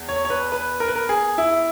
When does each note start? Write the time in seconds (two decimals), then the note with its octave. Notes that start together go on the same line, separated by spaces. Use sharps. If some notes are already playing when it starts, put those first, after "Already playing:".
Already playing: E2
0.09 C#5
0.25 C#5
0.30 B4
0.52 B4
0.80 A#4
0.88 B4
0.96 A#4
1.09 G#4
1.38 E4